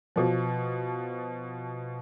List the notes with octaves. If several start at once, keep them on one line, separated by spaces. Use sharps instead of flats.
B2 F3